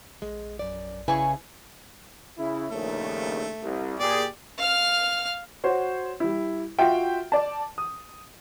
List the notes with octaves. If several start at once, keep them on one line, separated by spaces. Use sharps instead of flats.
A#1 G#3
F#2 D5
C#3 E4 G#4 B4 C#6
C#3 E4
A#1 D#2 C#3 A3
C2
A#2 G4 G#4 D5
F5 F6
F#4 C5 C#5
G3 E4
F4 F#4 E5 G5
D5 A5
D#6